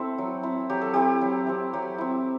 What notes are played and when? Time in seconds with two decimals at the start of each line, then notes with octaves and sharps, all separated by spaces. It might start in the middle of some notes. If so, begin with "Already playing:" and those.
Already playing: C4 E4 A4
0.18 F#3
0.43 C4 E4
0.70 F#3 G4
0.81 A4
0.94 C4 E4 G4
1.21 F#3
1.47 C4 E4
1.73 F#3 G4
1.98 C4 E4